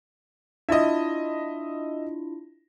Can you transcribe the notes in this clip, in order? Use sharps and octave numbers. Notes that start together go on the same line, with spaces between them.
D4 E4 F4 D#5 E5